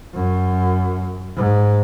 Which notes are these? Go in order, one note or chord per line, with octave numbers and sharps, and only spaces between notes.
F#2
G#2